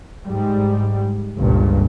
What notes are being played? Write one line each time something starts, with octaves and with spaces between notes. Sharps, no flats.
G#2 G3
G1 C#2 G2 A#2